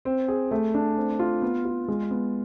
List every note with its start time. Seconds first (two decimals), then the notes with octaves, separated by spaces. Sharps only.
0.05 C4
0.28 G#4
0.51 A3
0.74 D4
0.97 C4
1.19 F4
1.42 B3
1.65 F4
1.88 G#3
2.11 B3